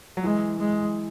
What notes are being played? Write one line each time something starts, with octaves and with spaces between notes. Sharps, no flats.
F#3
E3 G#3
G#3